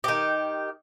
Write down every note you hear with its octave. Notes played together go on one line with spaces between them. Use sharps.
D#3 G4